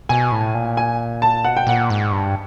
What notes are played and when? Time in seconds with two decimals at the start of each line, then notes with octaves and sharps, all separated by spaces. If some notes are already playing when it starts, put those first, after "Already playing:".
0.09 B2 G#5
0.32 A2
0.54 A#2
0.77 G#5
1.22 A5
1.44 B2 F#5
1.57 G5
1.67 A#2 F#5
1.90 G#2
2.12 G2